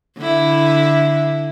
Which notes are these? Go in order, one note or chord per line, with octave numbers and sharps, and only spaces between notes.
D3 E4